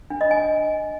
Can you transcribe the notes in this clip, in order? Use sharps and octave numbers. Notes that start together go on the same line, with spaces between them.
D4
D#5
G#5